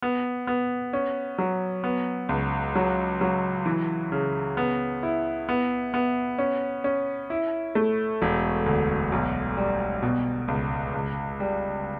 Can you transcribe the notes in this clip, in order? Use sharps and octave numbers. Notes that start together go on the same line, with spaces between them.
B3
B3
C#4
F#3
B3
C#2
F#3
F#3
E3
C#3
B3
E4
B3
B3
C#4
C#4
E4
A3
E1
D2
B1
G3
B2
C#2
C#2
G3